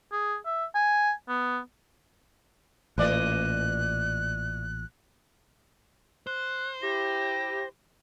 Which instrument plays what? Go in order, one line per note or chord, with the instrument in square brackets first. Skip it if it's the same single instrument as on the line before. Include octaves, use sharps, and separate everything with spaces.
[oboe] G#4
E5
G#5
B3
[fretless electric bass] A1 A#2 [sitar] E3 D5 D#5 [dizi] F#6
[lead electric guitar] C5 [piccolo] F#6
[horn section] E4 G4 [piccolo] A#6